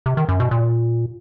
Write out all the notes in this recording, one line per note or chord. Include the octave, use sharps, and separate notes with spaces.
C3
D#3
F#2
B2
A#2